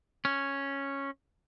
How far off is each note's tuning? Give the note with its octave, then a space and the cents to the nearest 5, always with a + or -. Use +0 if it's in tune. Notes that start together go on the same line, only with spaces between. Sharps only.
C#4 -5